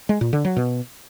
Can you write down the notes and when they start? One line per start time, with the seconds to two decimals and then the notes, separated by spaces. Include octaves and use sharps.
0.09 G#3
0.21 A#2
0.33 D3
0.45 F#3
0.56 B2